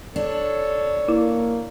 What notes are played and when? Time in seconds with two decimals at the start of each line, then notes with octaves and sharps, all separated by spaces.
0.16 D4 A4 C#5
1.09 A#3 E4